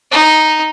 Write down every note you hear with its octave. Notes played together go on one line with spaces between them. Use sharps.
D#4